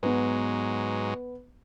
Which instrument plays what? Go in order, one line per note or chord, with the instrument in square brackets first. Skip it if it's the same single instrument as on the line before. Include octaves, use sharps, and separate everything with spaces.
[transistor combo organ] G#2 F#3 G#3 [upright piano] B3 B4